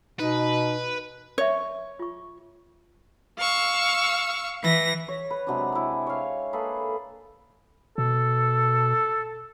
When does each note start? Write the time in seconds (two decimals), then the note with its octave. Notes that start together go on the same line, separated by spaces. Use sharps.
0.19 B2 D#4 B4
1.38 C#5 E5 C#6
1.99 F4 C#6
3.39 F5 C#6 E6
4.63 E3 A#6
5.08 C#5
5.31 B4
5.47 C3 F#3 G#3 D4
5.72 E4 G#5
6.07 C#5 F5
6.53 A#3 G#4 A4 B4
7.98 B2 A4